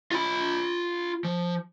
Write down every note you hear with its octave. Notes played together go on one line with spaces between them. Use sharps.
F4 B5
F3